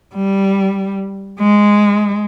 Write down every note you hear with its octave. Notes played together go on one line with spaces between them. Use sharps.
G3
G#3